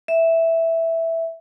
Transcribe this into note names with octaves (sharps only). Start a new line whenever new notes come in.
E5